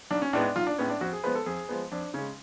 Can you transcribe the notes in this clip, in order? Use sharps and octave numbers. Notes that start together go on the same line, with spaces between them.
B1 D4
C#4
A2 G#3 B3 D4
D4
B1 F4
D4
A2 G#3 B3 C#4
D4
F2 F#4
G#4
F3 G#3 B3 B4
A4
F2 G#4
F3 G#3 B3
F2 D4
C#3 G#3 C#4